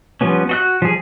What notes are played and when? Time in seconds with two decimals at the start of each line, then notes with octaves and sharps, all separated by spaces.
0.21 F3 G3 B3 C#4
0.49 F#4 D#5 F#6
0.82 F3 G3 G#4